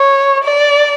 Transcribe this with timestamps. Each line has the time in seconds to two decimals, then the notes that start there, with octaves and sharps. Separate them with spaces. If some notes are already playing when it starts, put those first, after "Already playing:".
Already playing: C#5
0.44 D5